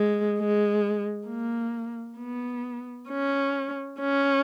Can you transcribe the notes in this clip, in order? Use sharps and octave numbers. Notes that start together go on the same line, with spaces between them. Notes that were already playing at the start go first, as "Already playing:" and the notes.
Already playing: G#3
G#3
A#3
B3
C#4
C#4